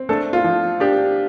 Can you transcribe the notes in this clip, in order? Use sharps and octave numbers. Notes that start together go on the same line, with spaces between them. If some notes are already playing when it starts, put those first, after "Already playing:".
Already playing: C4
A3 D4 A4
F4
F3
D4 G4